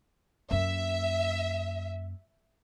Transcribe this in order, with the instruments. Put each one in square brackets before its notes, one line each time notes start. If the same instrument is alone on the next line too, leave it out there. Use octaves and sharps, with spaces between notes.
[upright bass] F#2 A#3 [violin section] E5